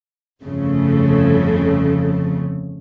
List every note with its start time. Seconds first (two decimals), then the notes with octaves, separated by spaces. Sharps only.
0.43 G1 F2 C#3 A3